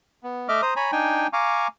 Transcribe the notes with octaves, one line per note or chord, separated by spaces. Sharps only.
B3
A3 D#5 E5 D6 F6
C5 A#5 D#6
C#5 G#5 A#5 B5
D4 D#4 G5 G#5
F5 G#5 A#5 C#6 D6